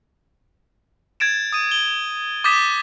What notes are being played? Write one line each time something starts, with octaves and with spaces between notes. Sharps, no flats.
G#6 A6 D7 E7
D#6 D#7
G7
D6 D#6 G6 A6 B6 E7